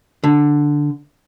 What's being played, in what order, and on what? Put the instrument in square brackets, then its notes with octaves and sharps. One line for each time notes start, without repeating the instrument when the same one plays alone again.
[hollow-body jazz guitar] D3